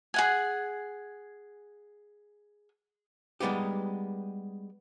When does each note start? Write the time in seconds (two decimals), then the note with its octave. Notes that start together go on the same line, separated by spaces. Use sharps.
0.14 G#4 F#5 G#5
3.40 G3 G#3 B3 D#4 G4